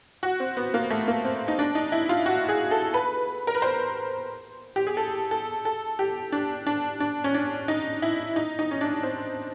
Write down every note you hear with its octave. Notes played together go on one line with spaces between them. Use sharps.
F#4
C4
B3
A#3
A3
A#3
C4
D#4
D4
D#4
E4
F4
F#4
G#4
A4
B4
A#4
B4
C5
G4
G#4
A4
A4
A4
G4
D4
D4
D4
C#4
D4
D#4
E4
D#4
D#4
C#4
D4
C4